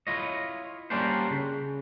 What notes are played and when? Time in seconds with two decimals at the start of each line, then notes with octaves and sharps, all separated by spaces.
0.07 E4 F4 C#5 D#5
0.90 G3 A#3 C#4 D4 F4 C5
1.31 C#3